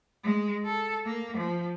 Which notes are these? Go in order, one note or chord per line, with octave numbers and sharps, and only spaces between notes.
G#3
A4
A#3
F3